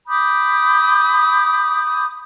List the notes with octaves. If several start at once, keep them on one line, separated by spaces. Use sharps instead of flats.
B5 D6 D#6 G6